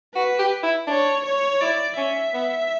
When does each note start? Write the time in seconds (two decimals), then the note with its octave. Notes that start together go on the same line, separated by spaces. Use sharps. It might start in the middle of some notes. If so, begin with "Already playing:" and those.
0.15 F#4 B4
0.39 G4
0.64 E4
0.88 D4 C#5
1.25 C#5
1.61 E4 D5
1.98 C#4 E5
2.34 B3